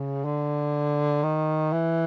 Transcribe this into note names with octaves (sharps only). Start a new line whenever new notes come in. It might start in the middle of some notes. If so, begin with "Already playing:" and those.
Already playing: C#3
D3
D#3
E3